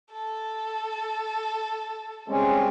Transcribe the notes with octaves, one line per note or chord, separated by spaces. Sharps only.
A4
C#3 G3 G#3 C4 C#4